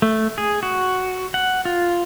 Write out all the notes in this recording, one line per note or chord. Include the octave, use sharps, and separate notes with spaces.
A3
G#4
F#4
F#5
F4